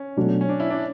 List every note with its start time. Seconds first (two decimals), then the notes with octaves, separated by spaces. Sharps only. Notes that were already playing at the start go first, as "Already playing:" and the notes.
Already playing: C#4
0.17 B2 F#3 A3 D4 F#4
0.41 C#4
0.49 D4
0.60 E4
0.70 D4